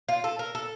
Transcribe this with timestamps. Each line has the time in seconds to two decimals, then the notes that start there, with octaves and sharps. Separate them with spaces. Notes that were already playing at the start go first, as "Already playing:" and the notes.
0.08 F4
0.24 A4
0.39 A#4
0.55 A4